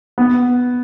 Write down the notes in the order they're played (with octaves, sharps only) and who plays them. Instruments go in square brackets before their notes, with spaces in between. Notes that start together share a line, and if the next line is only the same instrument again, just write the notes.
[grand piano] B3